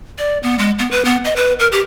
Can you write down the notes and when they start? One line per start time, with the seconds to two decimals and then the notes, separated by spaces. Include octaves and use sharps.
0.18 D5
0.43 B3
0.59 G#3
0.79 B3
0.91 B4
1.05 B3
1.24 D#5
1.36 B4
1.59 A#4
1.72 G4